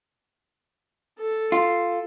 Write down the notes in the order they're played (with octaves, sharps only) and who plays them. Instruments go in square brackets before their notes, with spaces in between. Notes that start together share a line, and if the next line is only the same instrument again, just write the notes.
[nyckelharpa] A4
[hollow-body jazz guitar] F4